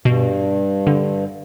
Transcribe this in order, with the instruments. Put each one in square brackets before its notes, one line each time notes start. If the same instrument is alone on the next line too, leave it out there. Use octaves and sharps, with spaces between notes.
[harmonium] G2 [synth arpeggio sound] B2
[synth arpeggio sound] D3